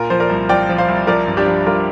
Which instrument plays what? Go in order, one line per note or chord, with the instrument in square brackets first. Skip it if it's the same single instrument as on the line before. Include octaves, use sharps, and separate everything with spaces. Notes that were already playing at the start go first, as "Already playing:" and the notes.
Already playing: [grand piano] A#2 F4 A#4
F3 C5
A#4 D5
C2
F3 D5 G5
F3
C5 F5
C2
F3 A#4 D5
G2
D4 G4
F3
G2 F4 A#4